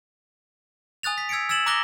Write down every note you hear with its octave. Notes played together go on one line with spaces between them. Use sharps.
G#5 D#6 F#6 A6 F7
B6
E6 G#6 B6 C#7 D7
E6 G#6 A6 E7 F#7
A#5 D6 E6 F#6 A#6 G7